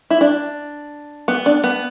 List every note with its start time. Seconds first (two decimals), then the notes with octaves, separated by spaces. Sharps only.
0.10 E4
0.21 D4
1.28 B3
1.46 D4
1.64 B3